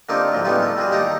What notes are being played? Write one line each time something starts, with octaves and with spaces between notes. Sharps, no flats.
D3 A#3 C4 D#4 F4 G4
A2 F3 F#3
A2 C#3 G3 B3 D#4 F4
A4
G3 F4 F#4 G#4
D#2 D#4 G4 A4 A#5